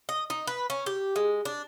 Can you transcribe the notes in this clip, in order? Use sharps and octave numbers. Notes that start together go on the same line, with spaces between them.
D#5
D#4
B4
C#4
G4
G#3
D4